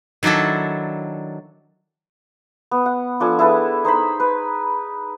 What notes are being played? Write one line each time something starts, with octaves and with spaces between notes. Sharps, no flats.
D#3 F#3 D4 E4 A4
B3
F#5
F3 D4 A4 G#5
E4 G#4 A4 B4
D#4 C5 G#5 B5
B4